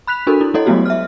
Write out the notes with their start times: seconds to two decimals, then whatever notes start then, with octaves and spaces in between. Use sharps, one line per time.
0.07 B5 F#6 B6 F7
0.27 D4 F#4 A4 A#4
0.41 E4
0.54 G3 E4 A4 C#5 D#5
0.66 F#3 G#3 A3 B3 F#4 G4
0.86 E5 F6